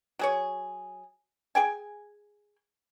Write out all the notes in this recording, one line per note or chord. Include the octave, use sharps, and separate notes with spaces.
F#3 G#4 C#5
G#4 G5 G#5